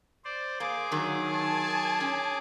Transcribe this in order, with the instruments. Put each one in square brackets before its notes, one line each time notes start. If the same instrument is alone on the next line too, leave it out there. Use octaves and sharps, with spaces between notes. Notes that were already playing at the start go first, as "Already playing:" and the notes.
[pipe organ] C5 D5
[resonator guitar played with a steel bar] A#3 [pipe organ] G#4 D6
[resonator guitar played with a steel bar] D#3 F#3
[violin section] G#5 A5
[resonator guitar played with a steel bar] C#4